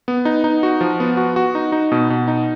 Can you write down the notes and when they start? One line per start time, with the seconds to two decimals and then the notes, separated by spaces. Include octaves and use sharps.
0.08 B3
0.25 D#4
0.44 D#4
0.63 F#4
0.81 F3
1.00 B3
1.17 F#4
1.36 F#4
1.55 D#4
1.72 D#4
1.92 B2
2.10 B2
2.28 D#4